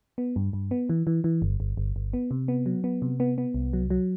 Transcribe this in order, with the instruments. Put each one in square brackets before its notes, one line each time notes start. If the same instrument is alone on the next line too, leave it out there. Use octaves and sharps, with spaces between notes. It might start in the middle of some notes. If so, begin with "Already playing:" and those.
[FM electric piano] B3
G2
G2
B3
E3
E3
E3
G1
G1
G1
G1
B3
C3
B3
F#3
B3
C3
B3
B3
C2
F#3
F#3